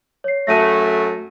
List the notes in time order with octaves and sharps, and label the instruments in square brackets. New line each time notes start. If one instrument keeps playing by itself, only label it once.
[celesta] C#5 C7
[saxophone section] F#2 F#3 A3 [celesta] A#6 D#7